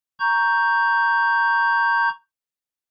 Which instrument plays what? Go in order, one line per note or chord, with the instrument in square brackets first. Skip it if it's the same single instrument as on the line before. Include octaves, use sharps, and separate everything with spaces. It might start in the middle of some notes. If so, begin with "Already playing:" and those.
[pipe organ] A#5 C#6 G6